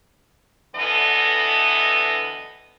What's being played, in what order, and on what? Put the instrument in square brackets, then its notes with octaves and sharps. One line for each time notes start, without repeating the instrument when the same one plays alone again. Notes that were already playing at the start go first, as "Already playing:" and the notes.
[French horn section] D2 D3 E3 B3 A4 D#5